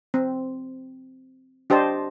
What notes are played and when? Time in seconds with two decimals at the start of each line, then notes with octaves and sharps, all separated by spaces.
0.14 C4
1.70 D4 G4 C5 D#5 A5